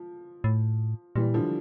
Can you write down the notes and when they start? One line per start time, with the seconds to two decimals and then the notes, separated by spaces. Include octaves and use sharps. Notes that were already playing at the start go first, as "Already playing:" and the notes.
Already playing: F3
0.44 A2
1.16 A#2 E3 G3
1.34 D3 F3